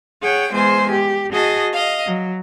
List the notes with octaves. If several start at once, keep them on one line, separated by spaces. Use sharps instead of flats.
G#4 C#5 F#5 G5
E2 G#3 C5 G#5
G4
F#4 G#4 D#5 A5
D#5 F5
F#3